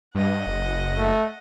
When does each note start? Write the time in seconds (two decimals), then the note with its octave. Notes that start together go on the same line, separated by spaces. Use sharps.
0.15 G2 D#5 F#5
0.47 F#1
0.98 A3